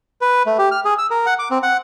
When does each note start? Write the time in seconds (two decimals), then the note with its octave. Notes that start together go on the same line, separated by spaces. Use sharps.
0.21 B4
0.46 A3
0.58 G4
0.71 F6
0.85 G#4
0.98 E6
1.11 A#4
1.26 F#5
1.39 D6
1.51 C4
1.63 F#5